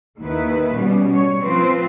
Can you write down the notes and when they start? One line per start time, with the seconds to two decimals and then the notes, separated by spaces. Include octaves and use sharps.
0.19 D#2 D#3 E4 B4
0.75 B2 G3 C#4
1.12 G3 C#5
1.42 F3 C4 F4 B4 C5